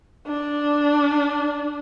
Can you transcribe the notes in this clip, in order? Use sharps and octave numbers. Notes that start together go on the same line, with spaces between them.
D4